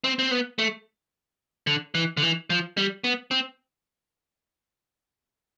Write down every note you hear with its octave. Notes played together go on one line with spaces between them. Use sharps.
C4
C4
B3
A3
D3
E3
D3
E3
F3
G3
B3
C4